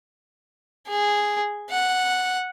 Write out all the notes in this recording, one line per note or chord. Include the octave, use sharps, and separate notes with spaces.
G#4
F#5